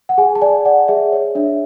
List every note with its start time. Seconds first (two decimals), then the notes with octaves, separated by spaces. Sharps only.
0.09 F#5
0.18 G#4 G#5
0.35 A5
0.42 D5 G#5
0.65 D5 F#5
0.88 G#4 E5
1.12 C#5
1.35 D4 E5